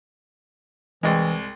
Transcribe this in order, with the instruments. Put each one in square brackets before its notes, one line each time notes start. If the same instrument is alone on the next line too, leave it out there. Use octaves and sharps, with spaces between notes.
[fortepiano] C2 G#3 [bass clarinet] E3